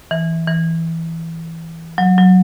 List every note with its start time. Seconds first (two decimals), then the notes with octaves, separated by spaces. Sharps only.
0.11 E3
0.48 E3
1.98 F#3
2.18 F#3